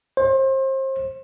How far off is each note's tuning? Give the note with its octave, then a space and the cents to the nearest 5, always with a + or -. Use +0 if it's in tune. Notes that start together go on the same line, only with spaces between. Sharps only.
C5 +30